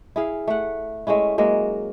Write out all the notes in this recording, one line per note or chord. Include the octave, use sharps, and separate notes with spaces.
E4 G#4 F5
A3 F#5
G#3 A3 C#4 E4
F#3 G#3 A#3 A#4